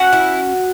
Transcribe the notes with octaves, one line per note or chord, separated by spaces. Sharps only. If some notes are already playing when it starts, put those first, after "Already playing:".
Already playing: C#4 F#4 F#5
E4